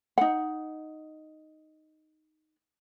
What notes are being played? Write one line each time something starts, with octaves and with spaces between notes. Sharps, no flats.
D#4 F#5